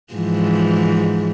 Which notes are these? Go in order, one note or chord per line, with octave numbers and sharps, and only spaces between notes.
G#2 E3 F3